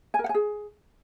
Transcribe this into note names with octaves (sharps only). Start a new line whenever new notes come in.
G#5
A#4
F#5
G#5
G#4